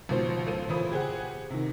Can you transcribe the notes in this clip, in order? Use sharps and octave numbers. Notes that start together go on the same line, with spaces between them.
G#1 B2 F3 C5
C#2 A4 C5 D#7
A#2 E3 E4 C5 B5 D#6
G4 G#4 C5 F#5
C3 D#3